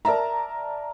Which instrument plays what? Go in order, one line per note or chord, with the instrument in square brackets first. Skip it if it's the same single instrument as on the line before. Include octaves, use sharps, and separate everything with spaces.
[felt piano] A#4 D5 E5 A5 A#5